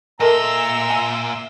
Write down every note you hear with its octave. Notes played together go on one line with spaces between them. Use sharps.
A#2 A4 A#4 D#5 E5 A#5 C6 E6
G#5